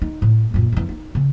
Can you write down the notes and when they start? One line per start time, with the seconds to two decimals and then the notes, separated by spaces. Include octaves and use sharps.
0.02 D#4
0.22 A2
0.54 F#2 A#2
0.72 F2 E3
0.89 D#4
1.15 C#3